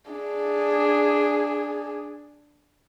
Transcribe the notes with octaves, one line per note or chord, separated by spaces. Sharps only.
D4 G#4